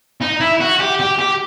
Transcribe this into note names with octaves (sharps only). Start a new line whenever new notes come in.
D#4
E4
F#4
G4
G4
G4